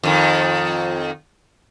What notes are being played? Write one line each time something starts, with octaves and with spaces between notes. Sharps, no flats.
F2 D#3